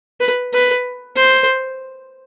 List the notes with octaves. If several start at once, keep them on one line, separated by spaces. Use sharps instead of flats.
B4
B4
C5